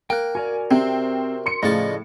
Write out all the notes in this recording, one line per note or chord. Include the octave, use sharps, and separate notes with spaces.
A#3 G5 F#6
F#4 A#4 D5 G#5
C3 C4
C6 C#7
A2 C#3 F3 D5 D#5 A5